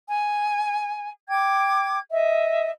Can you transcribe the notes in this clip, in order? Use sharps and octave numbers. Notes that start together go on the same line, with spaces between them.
G#5
G5 D6 G#6
D#5 E5